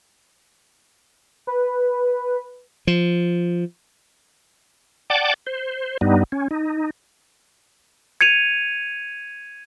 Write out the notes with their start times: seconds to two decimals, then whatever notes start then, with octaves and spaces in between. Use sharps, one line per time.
1.47 B4
2.87 F3
5.10 D5 F#5 G5 A5 D6
5.47 C5
6.01 G2 G3 B3 D#4
6.32 C#4
6.51 D#4
8.21 G#6 C#7 D#7 F7